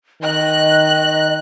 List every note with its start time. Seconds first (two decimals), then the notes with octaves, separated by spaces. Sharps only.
0.22 D#3 D#5 F#6